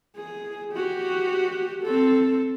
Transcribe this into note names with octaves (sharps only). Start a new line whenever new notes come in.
G#4
F#4 G4
C4 A4